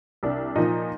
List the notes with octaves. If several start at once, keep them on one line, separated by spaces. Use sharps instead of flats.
C2 D4
A#2 F3 D#4